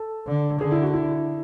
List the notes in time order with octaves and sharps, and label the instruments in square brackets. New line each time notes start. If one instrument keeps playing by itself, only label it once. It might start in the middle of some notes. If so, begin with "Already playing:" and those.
Already playing: [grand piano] A4
[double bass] D3
[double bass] D3 [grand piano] G#4
[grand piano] E4
F#4
E4